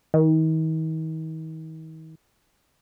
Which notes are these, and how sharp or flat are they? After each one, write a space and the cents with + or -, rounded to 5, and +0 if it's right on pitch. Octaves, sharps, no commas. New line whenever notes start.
D#3 +40